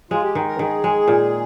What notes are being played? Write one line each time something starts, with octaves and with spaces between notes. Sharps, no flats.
G#3 F4
G4
D#3
A#4
D#3 G#4
G#3
A#2